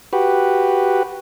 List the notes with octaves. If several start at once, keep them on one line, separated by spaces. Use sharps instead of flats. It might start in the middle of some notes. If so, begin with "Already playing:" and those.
F#4 G4 B4